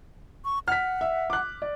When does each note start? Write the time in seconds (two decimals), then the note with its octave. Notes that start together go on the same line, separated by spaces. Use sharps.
0.45 C#6
0.68 F#5 F6 B6
1.01 E5
1.30 D6 F#6
1.62 D5